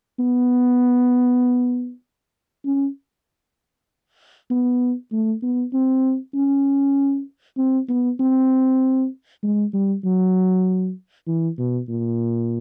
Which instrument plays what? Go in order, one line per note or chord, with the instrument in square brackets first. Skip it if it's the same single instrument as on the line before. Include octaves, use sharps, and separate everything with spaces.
[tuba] B3
C#4
B3
A3
B3
C4
C#4
C4
B3
C4
G#3
G3
F#3
E3
B2
A#2